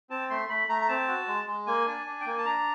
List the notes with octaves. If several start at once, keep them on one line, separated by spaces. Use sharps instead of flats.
C4 A5
A3 C6
A3 B5
A3 A#5
A#5
C4 A5
F#4
G#3
G#3
A#3 G#5
D4
D4
G5
A#3 G#5
A5
D4 A#5